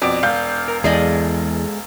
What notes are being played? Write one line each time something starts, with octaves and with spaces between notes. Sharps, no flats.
F2 B2 D5
E1 F5 G6
A#4
E2 G#3 G#4 A4 D5 D#5